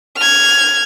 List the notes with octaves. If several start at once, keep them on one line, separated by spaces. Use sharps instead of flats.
F6 G#6